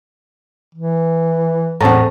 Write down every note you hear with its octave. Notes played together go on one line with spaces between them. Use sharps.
E3
E2 A2 C4 A5 A#5